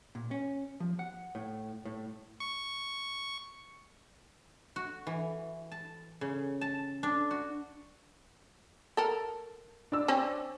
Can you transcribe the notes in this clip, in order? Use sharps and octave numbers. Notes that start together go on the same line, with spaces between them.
A#2
C#4
F3
F#5
A2
A2
C#6
F#4
E3
A5
C#3
A5
D4
F#4
A4 A#4
D4 E6
C4 C#4 C5